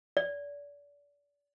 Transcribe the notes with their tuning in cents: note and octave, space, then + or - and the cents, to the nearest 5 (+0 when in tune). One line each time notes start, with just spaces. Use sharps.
D5 -30